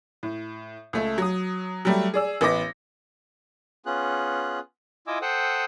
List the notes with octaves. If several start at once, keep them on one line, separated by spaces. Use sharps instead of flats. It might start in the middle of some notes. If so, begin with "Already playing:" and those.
A2
C#2 A3
F#3 D#6
F#3 G3 A3
G#4 D5 E6
A1 B3 D#5 D6 A#6
B3 C#4 F4 G#4 F#6
E4 F4 D#5 G#5 D6 E6
A4 C5 F#5 G5 D#6 E6